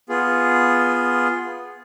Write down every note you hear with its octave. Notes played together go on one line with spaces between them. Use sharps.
B3 F4 G#4